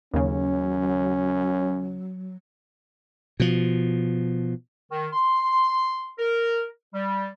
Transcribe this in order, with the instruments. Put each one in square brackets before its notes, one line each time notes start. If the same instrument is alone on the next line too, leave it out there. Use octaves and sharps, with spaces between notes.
[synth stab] D#2 C#3 [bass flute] F#3 [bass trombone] C#4
[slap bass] B2 F3
[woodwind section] D#3
C6
A#4
G3